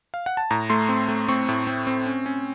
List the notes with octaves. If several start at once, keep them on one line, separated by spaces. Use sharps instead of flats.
F5
F#5
A5
A2 A#5
A3 C6
C4
A3
C4 C#6
A2
C4
C4
C#4
C#4